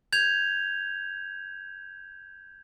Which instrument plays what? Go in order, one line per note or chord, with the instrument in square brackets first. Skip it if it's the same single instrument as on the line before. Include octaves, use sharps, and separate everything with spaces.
[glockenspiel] G6 G#6 F7